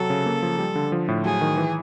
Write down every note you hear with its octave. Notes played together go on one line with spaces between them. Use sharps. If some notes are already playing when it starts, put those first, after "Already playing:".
Already playing: C3 F#3 A4
C#3
A#3
F3
G3
D3
F3
A2
F#3 G#4
D#3
E3